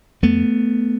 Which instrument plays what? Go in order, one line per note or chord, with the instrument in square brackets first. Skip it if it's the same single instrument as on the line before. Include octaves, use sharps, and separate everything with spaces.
[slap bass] F2 A3 B3